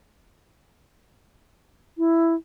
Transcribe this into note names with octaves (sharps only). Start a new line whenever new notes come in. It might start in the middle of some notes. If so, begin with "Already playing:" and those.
E4